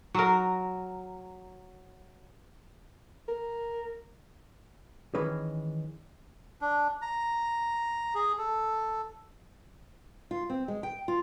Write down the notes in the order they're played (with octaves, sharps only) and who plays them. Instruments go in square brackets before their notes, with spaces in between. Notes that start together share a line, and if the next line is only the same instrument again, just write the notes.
[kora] F#3 A#4
[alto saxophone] A#4
[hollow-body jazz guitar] D#3 E3 G#3 C#4 B4
[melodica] D4
A#5
G#4
A4
[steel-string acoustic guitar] F4
C4
G#3
G5
F4